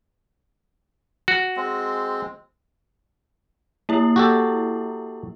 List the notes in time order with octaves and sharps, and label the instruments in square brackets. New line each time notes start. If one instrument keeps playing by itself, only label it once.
[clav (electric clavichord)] F#4
[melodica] G#3 C4
[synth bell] A#3 E4
[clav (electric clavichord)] F#4 G4 A4